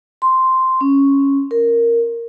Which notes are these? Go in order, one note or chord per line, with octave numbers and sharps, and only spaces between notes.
C6
C#4
A#4